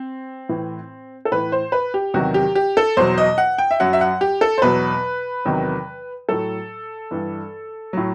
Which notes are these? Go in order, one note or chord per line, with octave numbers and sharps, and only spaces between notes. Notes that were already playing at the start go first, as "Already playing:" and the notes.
Already playing: C4
A2 E3
A4
A2 E3 B4
C5
B4
G4
E2 C3 D#3 F#3 F#4
G4
G4
A4
E2 B2 F#3 C5
D#5
F#5
G5
E5
F#2 F#3 F#5
E5
F#5
G4
A4
C5
E2 B2 F#3 B4
E2 C3 D#3 F#3
A2 F#3 A4
G2 E3
A2 F#3